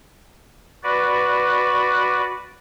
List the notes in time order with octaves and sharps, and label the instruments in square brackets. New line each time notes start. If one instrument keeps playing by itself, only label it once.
[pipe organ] F#4 B4 D5